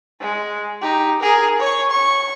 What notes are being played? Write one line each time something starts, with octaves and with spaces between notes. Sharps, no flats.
G#3
D#4 G4
G#4 A#4
C#5 C#6
C#6